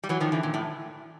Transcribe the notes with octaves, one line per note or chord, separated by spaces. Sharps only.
G3
E3 F#3
D#3 F3
D3 E3
A#2
A2